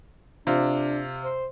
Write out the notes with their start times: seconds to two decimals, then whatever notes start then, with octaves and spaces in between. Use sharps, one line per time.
0.47 C3 D4 F4
1.24 C5